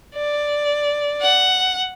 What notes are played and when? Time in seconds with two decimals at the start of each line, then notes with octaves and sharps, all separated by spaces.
0.15 D5
1.21 F#5